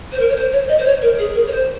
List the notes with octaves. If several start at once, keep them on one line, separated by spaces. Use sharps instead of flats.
C5
A#4
C#5
C5
C#5
D#5
C5
C#5
A#4
G#4
A#4
C#5
C5